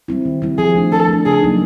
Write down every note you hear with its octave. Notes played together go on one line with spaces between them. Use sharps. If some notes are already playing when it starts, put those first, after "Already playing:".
G3 C4 E4
D#3
G3 C4 E4
F3 G#4
A3 D4
F3 A4
A3 D4
C#3 G#4
F#3 A#3 D#4